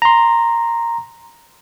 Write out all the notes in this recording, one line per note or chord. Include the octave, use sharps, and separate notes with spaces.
A#5 C6